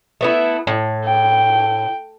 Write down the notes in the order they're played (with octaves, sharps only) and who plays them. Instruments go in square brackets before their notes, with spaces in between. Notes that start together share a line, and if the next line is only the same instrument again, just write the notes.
[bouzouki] A3 B3 E4
A2
[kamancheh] G5